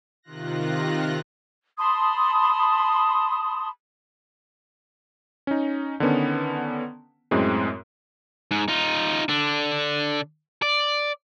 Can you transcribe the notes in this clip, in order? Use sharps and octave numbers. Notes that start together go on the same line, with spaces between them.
C3 D#3 F4 F#6 A#6
A5 B5 C6 D#6
C#4 D#4
D3 D#3 B3 C#4
F#2 A2 G#3 C4
G#2
D#4 F4
D3 D4
D5